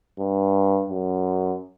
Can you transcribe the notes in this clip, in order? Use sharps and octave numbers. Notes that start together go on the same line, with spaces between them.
G2
F#2